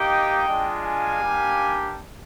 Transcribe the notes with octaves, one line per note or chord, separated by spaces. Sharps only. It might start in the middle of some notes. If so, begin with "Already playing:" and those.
Already playing: A#3 D#4 G4 D#5 G5
G#3 D4 F4
F5 G#5
G3 A#3 D4 G4